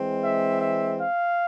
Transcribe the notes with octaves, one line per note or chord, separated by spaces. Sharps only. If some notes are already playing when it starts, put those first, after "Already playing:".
Already playing: E3 G#3 C4
E5
E5
F5